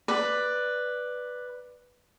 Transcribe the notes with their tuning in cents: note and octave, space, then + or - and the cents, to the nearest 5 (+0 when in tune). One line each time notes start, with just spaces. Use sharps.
B4 +0 D5 +10